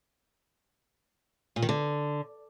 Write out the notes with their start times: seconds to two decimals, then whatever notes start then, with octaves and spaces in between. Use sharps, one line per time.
1.56 A#2
1.62 D#3
1.69 D3